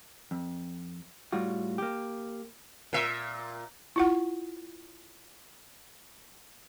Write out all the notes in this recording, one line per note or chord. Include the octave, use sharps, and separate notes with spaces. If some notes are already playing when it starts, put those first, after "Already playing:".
F2
A2 G3 F4 F#4
A#3 G4
A#2 E5
E4 F4 F#5